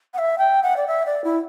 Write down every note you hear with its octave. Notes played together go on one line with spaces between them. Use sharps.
F#5
E5
G5
F#5
D5
E5
D5
E4